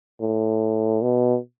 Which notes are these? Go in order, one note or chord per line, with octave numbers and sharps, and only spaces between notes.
A2
B2